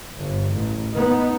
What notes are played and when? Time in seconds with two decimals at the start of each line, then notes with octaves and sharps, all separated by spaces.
0.18 G1
0.53 A1
0.94 B3 D#4